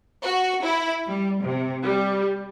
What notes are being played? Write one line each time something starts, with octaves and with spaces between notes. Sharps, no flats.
F#4
E4
G3
C3
G3